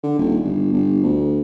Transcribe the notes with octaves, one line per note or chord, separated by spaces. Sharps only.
D3
D#1
G1
G1
D2